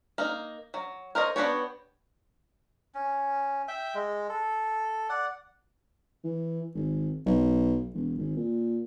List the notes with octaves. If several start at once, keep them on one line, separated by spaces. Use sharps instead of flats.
A#3 D#4
F#3
A#4 C5 C#5 D#5
B3 D4 F#4 G4 C#5
C#4
E5 G5
G#3
A4
D5 F#5
E3
G#1
B1
E1
G#1
A#2